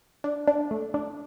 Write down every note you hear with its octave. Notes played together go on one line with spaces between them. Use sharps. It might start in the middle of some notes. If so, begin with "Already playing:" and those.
D4
D4
A3
D4